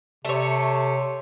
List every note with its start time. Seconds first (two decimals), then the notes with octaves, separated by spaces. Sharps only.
0.25 C3 A3 C#5